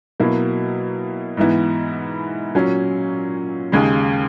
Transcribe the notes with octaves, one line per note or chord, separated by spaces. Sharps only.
B2 F#3 A#3 E4
G#2 E3 B3 E4
A#2 F#3 C#4
D#2 C#3 G#3